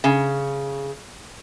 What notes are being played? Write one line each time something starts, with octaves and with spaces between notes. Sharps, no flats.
C#3